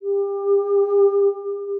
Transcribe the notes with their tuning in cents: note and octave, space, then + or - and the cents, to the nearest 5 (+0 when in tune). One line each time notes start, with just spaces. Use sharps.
G4 +25